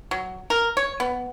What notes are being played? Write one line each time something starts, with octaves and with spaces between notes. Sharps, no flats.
F#3
A#4
C#5
B3